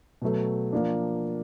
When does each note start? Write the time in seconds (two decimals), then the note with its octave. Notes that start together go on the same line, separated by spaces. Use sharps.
0.22 B2 F#3 A3
0.73 F3 A#3 D4